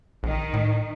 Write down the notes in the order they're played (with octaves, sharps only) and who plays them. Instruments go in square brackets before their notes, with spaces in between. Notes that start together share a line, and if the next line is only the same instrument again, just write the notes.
[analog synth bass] A#1 [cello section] D#3
[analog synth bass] A2